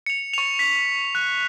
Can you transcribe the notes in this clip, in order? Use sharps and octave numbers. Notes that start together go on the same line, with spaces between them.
C#7 F7
C#6 F7
B6
F#6